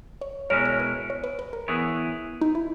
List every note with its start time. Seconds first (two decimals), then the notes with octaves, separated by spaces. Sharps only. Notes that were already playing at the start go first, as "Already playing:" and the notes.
0.21 C#5
0.50 B2 G#3 C#4 E4 A#4 C#5
0.65 C#5
0.80 B4
1.10 C#5
1.24 B4
1.39 B4
1.53 A#4
1.68 E3 B3 E4 G#4 C#5
2.41 D#4
2.55 E4